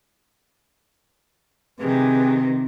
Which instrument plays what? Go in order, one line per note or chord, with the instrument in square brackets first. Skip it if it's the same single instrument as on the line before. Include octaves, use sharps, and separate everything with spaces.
[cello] C3 D#3 [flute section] G4 G#4 B4